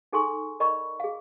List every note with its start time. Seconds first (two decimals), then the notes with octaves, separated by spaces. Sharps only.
0.13 D#4 G#4 A4 G#5 C6 C#6
0.60 A#4 D5 D#5 B5 C#6
1.00 G#4 F5